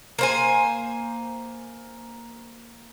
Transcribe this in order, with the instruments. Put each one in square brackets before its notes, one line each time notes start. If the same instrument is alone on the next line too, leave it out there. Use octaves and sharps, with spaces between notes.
[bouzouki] A#3 C5 G#5